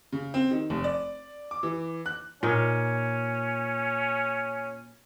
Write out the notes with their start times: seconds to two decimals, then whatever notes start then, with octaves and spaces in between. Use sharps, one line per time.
0.12 C#3
0.34 C4
0.51 D#3
0.70 F1
0.84 D5
1.51 D6
1.63 E3
2.06 F#6
2.43 A#2 C#4 D#4